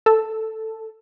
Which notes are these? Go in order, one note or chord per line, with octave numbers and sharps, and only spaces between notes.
A4